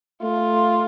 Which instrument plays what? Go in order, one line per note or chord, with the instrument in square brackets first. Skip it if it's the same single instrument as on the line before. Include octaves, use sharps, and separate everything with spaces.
[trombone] A3 [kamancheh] F4